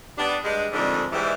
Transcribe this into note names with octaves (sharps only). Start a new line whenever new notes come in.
G3 B3 D4
G2 G3 G#3
F2 G#2 D3 D#3 G3 D4
G#2 E3 G3